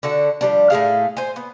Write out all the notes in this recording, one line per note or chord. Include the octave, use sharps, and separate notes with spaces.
D3 F#4 A4
F3 G3 D4
A2 A3 G#4 F5
C5 G#5
B3